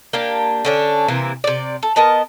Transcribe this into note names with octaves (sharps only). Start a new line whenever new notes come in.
A#3 D4 G4
D3 C#4 D4
C3 E3 A#3
C3 D5
A4
B3 A#4 D#5 A5